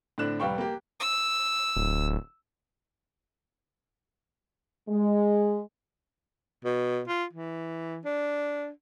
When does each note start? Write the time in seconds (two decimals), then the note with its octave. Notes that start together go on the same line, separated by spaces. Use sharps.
0.18 A2 D3 C4 D4 F#6 E7
0.40 F1 G3 B4 F5 G5 C#6
0.58 A#3 G4
1.00 E6
1.76 D1
4.89 G#3
6.65 B2
7.08 F4
7.33 E3
8.05 D4